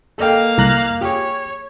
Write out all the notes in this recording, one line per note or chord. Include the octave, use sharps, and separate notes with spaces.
A#3 A4 D#5 F5 G5
C2 A#5 F#6
G4 G#4 C#5